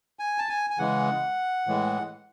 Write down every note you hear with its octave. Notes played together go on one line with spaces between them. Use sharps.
G#5
A5
G#5
G#5
C#3 E3 G#3 F#5
A2 E3 G#3